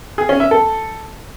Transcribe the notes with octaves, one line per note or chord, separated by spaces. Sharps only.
G#4
C#4
E5
A4